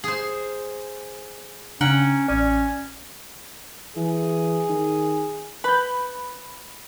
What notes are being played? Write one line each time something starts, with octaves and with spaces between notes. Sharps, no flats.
G#4 C5
C#3 C#4 D4 F#5 G5 A#5
A1 C#4 D5
E3 G#4
D#3
B4 B5 G6